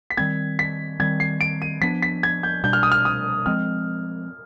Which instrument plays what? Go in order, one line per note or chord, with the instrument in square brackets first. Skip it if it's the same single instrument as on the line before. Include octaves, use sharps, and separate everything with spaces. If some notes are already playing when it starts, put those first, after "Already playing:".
[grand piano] B6
[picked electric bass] D#3 G3 C4 [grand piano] G#6
[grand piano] B6
[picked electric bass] D#3 G3 C4 [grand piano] G#6
[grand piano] C7
D7
D#7
[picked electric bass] F3 B3 D4 [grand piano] B6
[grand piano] B6
G#6
G6
[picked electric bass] B2 G3 D4 [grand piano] G6
[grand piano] F6
D#6
F6
D#6
[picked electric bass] F3 G#3 C4 [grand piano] F6